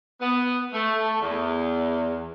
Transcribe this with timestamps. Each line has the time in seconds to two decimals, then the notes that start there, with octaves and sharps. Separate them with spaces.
0.20 B3
0.73 A3
1.21 E2